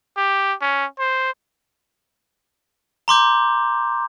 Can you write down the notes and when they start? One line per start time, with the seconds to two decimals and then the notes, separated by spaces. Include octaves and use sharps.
0.17 G4
0.62 C#4
0.99 C5
3.08 A#5 C6 D6 G6